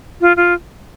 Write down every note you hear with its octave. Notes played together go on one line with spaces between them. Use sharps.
F4
F4